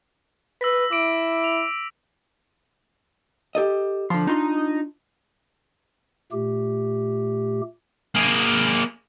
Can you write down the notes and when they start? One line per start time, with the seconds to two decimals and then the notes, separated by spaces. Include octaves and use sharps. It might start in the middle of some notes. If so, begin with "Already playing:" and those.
0.61 B4 E6 A#6 B6
0.91 E4 D6 D7
1.44 F7
3.55 G4 A4 D#5
4.10 D3 F3 C6
4.27 D4 D#4 F4 C6
6.32 A#2 A3 G4
8.15 A#3 G#4